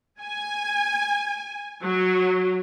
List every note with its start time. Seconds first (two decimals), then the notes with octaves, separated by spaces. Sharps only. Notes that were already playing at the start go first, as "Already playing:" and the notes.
0.21 G#5
1.83 F#3